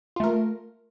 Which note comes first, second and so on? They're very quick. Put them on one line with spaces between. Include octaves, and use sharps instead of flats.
F4 A3 A#4